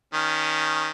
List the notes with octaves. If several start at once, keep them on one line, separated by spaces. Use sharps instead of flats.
D#3 C#4